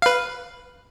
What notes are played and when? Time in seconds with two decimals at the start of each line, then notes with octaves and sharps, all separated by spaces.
0.02 B4 F5